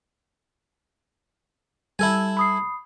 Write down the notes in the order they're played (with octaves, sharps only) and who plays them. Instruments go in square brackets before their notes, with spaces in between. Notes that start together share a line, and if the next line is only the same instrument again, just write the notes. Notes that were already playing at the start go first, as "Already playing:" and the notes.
[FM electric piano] G3 [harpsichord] E4 A4 G#5
[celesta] B5 D#6 C7